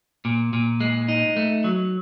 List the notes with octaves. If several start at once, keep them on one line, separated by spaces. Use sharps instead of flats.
A#2
A#2
G#3
D#4
A3
F#3